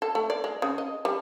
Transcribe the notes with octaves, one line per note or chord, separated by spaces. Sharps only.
A4
A3
D5
G#3
C#3
D#5
G3